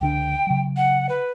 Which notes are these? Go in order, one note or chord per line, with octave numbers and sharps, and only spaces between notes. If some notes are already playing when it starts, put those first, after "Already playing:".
C#2 D3 D4 G5
C#3 F#3
F#5
B4